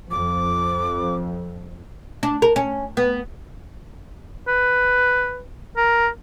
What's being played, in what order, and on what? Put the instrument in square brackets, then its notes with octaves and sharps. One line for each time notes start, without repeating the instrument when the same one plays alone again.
[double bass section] F2 [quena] D6
[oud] D4
A#4
C#4
B3
[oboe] B4
A#4